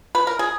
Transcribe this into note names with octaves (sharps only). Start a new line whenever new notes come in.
B4
A#4
G#4